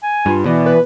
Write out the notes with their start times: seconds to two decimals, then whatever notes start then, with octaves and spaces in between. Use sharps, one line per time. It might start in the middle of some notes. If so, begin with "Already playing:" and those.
0.03 G#5
0.26 G2 F4
0.45 B2 E3 D5
0.66 B4